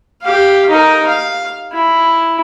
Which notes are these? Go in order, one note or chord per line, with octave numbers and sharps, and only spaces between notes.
G4 F5
D#4 A#4
F5
E4